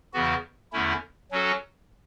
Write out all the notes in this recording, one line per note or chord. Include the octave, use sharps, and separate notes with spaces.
E2 C#3 E3 B3 F#4
E2 D3 A3 C#4 E4
F#3 C#4 F#4 A4